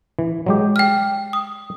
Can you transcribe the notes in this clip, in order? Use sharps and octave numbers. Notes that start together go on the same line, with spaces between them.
E3
F#3 G#3 G4
G5 F6
D#6